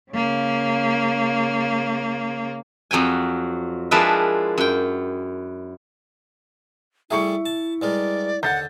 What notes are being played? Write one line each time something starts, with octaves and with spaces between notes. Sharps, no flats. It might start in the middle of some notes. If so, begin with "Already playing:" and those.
C#3 A#3
F2 F#3 G5 G#5
F3 G#3 D4 E4 A#4 B4
F#2 G5
G3 A3 E4 G#4 E5 C#6 C#7
A5
G2 G#3 A#4 D5
D#2 D3 F#5 G6 A6